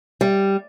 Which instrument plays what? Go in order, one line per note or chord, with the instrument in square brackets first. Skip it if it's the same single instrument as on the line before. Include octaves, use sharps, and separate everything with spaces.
[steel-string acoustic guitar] G3